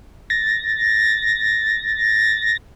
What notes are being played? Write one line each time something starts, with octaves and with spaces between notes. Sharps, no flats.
A6 A#6